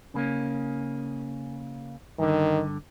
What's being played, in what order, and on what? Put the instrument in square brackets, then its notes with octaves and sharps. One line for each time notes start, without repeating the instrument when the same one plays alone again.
[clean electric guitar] C#3 A#3 C#4
[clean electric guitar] G2 D3 [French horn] D#3